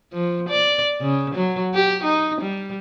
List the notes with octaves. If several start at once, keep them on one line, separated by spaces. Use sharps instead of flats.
F3
D5
C#3
F#3
G4
D#4
G3